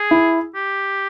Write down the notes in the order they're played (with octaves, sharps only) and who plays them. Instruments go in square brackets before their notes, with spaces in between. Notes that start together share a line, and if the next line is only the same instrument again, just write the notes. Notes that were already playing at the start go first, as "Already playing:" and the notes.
Already playing: [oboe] G#4
[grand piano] E4
[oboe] G4